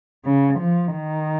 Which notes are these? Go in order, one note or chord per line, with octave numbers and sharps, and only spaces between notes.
C#3
F3
D#3